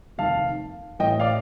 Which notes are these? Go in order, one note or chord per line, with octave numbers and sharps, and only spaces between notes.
F1 D#2 D#3 F5 A5
A1 A2 D#5 G5
D5 F5